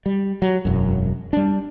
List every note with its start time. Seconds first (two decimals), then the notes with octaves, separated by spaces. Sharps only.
0.06 G3
0.42 F#3
0.65 E1 F#2
1.33 G3 D4